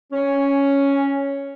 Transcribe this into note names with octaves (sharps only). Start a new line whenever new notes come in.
C#4